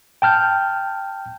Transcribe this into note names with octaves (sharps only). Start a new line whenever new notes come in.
G5 A5 F6 G6